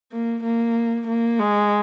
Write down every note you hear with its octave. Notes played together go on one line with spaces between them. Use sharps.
A#3
A#3
A#3
G#3